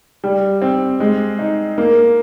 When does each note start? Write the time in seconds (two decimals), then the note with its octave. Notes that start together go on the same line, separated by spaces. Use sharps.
0.24 G3
0.62 C4
1.00 G#3
1.39 D#4
1.78 A#3